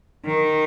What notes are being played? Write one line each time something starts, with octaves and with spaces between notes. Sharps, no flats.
D#3